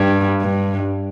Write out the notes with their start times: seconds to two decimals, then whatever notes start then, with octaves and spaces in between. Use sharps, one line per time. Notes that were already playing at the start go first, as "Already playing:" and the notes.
Already playing: G2
0.41 G2